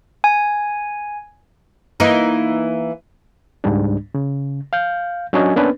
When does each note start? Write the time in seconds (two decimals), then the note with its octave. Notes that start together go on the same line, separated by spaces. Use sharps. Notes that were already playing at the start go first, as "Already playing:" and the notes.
0.24 G#5
2.00 E3 A#3 D#4
3.64 C#2 G#2 G3 D4
4.15 C#3
4.73 F5 G6
5.33 F#3 C#4 D4 F#4 D#5 G#5
5.56 A#3 B3 C#4 D4 B4